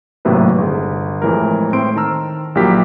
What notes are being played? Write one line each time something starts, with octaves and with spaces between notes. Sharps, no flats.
G#1 A2 C3 F#3 A#3 B4
G1 G4 G#4
F2 A2 E3 G#3 A#4
A2 C4 C6 D7
D#3 A5 A#5 E6 F6
A#1 F#3 A#3 E4 G4 B6